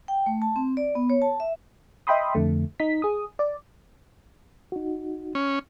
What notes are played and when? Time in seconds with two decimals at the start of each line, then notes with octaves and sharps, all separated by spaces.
0.08 G5
0.26 A3
0.42 A5
0.56 C4
0.77 D5
0.95 B3
1.10 C#5
1.22 A5
1.40 E5
2.07 D#5 E5 G5 B5 C6 D#6
2.35 F2 D3 A3
2.80 D#4 B6
3.02 G#4 D#6
3.39 D5
4.72 D#4 F#4
5.35 C#4